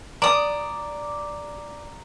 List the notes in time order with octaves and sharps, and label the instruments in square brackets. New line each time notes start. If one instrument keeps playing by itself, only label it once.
[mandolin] D5 D#6 [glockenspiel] A#5